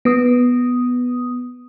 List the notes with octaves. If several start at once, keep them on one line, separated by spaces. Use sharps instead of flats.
B3 D#6